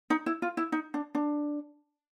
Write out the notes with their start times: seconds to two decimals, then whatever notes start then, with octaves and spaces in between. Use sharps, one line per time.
0.10 D#4
0.26 E4
0.42 F4
0.57 E4
0.72 D#4
0.94 D4
1.15 D4